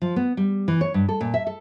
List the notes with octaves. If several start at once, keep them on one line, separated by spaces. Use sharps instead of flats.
F3
B3
G3
E3
C#5
G2
A4
A#2
E5
A4